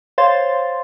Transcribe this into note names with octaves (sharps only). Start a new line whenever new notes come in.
C5 C#5 F5 C6 A6